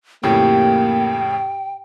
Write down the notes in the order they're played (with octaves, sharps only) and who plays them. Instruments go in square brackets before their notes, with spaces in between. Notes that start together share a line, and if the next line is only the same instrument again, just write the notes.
[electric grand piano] F2 A2 C#3 [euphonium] A#3 [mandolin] G4 [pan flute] G5